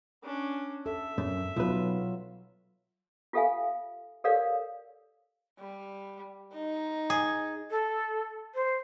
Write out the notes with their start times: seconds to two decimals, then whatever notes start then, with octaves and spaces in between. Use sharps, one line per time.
0.23 C#4 D4
0.86 A4 E5
1.18 F#2
1.56 B1 F#3 F4 B4
3.33 F4 G4 A4 E5 F5 G#5
4.24 G4 A4 A#4 C#5 D5 F5
5.60 G3
6.53 D#4
7.10 G#4
7.70 A4
8.54 C5